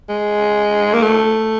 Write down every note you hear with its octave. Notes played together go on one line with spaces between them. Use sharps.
G#3
A#3
A3